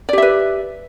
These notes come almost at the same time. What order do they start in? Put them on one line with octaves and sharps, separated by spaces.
D5 G4 E5 B4